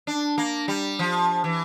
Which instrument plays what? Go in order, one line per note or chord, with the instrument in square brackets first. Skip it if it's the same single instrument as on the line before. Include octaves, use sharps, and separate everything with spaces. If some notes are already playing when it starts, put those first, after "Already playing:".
[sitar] D4
A#3
G3
F3
E3